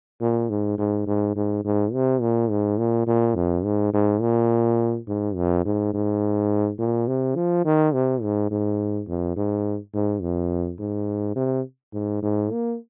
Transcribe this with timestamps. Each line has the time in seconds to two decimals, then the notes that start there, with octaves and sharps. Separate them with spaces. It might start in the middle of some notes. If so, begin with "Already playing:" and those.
0.21 A#2
0.50 G#2
0.78 G#2
1.06 G#2
1.36 G#2
1.64 G#2
1.93 C3
2.21 A#2
2.50 G#2
2.78 A#2
3.07 A#2
3.35 F2
3.64 G#2
3.93 G#2
4.21 A#2
5.07 G#2
5.35 F2
5.65 G#2
5.94 G#2
6.79 A#2
7.08 C3
7.35 F3
7.65 D#3
7.93 C3
8.22 G#2
8.51 G#2
9.07 F2
9.36 G#2
9.93 G#2
10.21 F2
10.79 G#2
11.36 C3
11.93 G#2
12.22 G#2
12.51 A#3